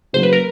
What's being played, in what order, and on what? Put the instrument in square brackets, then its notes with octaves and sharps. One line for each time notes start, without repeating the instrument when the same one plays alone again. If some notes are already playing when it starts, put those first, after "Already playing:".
[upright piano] C#3 F#3 A#3 [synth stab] C5
[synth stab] B4
A#4